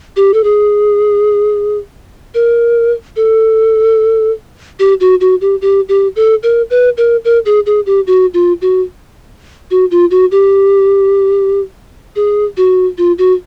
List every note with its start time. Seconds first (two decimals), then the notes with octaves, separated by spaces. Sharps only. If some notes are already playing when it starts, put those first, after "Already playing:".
0.16 G4
0.34 A4
0.44 G#4
2.34 A#4
3.16 A4
4.79 G4
5.00 F#4
5.21 F#4
5.41 G4
5.62 G4
5.89 G4
6.16 A4
6.43 A#4
6.70 B4
6.97 A#4
7.25 A#4
7.46 G#4
7.66 G#4
7.86 G4
8.07 F#4
8.34 F4
8.62 F#4
9.71 F#4
9.91 F4
10.11 F#4
10.31 G4
12.16 G#4
12.57 F#4
12.98 F4
13.18 F#4